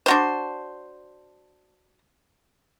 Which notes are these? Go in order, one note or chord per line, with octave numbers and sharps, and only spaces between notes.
D4 F#4 C5